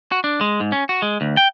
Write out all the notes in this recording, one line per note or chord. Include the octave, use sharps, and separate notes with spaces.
F#4
D4
G#3
G#2
C#4
F#4
G#3
D2
G5